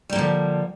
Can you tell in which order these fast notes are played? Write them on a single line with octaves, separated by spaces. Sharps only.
G3 A#3 F3 D3